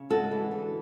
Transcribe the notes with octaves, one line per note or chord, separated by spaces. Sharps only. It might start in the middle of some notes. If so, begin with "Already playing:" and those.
Already playing: C#3
G#3 F#4 A4
E3
D3